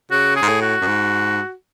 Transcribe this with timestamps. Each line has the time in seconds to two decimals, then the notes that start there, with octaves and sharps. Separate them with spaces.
0.11 C#3 F#4
0.36 G#4
0.42 G#2
0.49 A2
0.62 F#4
0.81 F#2
0.87 G#2